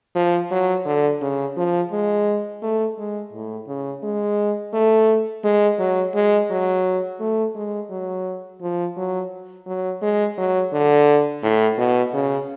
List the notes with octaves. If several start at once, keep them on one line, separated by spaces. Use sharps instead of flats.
F3
F#3
D3
C#3
F3
G#3
A3
G#3
A2
C#3
G#3
A3
G#3
F#3
G#3
F#3
A3
G#3
F#3
F3
F#3
F#3
G#3
F#3
D3
A2
B2
C#3